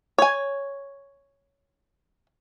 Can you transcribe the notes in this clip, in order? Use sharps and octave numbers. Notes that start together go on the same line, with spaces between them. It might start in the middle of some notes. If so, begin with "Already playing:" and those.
C#5 G#5